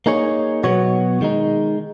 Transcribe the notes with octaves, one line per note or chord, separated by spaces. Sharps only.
A#3 D#4 G#4 C#5
B2 F#3 B3 F#4 C#5
D#3 G#3 D#4